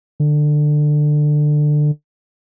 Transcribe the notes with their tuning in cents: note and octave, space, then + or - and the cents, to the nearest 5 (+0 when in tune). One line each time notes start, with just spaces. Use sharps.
D3 +20